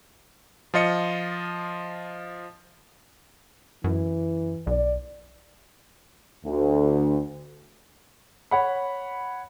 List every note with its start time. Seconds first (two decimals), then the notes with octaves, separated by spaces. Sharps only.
0.74 F3 F4 D#5 C#7
3.84 F#2 E3
4.67 B1 D5
6.46 D2
8.51 C#5 F#5 B5